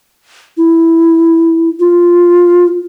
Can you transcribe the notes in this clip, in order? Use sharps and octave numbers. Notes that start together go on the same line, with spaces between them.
E4
F4